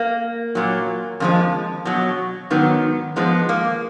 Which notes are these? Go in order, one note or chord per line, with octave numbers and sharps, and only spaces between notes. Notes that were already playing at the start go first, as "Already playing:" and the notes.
Already playing: A#3
A#2 F#3
F2 D3 F3 G#3
B2 F#3
G#2 D#3 F#3 B3
G#2 F3 G#3 B3
A#3